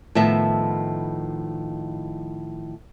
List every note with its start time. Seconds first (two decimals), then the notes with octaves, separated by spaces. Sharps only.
0.15 A2 D#3 F3 B3 E5 A5